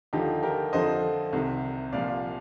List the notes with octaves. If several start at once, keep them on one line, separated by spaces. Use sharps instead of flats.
D#2 D3 F3 D#4 G4
G4 A#4
F2 D3 F3 C5 D#5
C2 C3 D#3
C2 A#2 F3 D5 F5